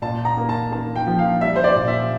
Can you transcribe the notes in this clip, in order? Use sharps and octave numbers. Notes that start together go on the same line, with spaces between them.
A#2 A5
A#5
A#3
A5
A#3 A5
G5
F3
F5
G3 E5
C5
D5
A#2
E5